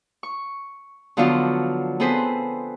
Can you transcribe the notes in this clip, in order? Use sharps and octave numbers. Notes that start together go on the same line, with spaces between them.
C#6
D3 F3 F#3 B3 D4 F4
B3 C4 G#4 A4 B4 C5